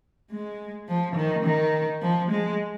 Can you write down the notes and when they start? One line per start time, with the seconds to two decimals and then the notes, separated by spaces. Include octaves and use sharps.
0.31 G#3
0.88 F3
1.16 D#3
1.45 D#3
2.02 F3
2.31 G#3